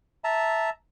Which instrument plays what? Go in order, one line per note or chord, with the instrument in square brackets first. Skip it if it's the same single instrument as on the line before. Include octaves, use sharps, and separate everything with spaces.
[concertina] E5 A5 A#5